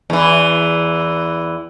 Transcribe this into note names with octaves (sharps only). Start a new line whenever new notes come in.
E2 E3